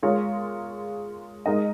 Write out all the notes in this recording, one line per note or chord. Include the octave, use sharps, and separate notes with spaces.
G#3 F4 A#4 C#5
G#3 D#4 A#4 D#5